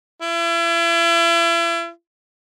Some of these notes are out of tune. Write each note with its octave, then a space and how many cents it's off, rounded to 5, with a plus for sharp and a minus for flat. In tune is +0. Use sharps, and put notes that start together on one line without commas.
E4 +40